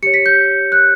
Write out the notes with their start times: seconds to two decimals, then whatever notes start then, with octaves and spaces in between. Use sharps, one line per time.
0.03 G4 C#7
0.06 C#5
0.14 B6
0.26 G6
0.72 F#6